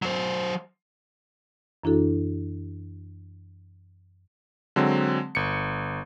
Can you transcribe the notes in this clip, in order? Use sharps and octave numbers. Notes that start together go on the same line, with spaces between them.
F#3 C5
F#2 E3 D4 E4 F#4 A4
D3 F#3 G#3 C4
G1 C#7